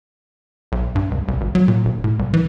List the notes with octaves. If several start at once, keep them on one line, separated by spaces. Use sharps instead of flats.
B1
G2
C#2
C2
G#1
F#3
A#2
E1
A2
C2
E3